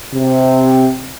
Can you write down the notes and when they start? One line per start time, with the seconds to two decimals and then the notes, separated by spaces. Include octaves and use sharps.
0.14 C3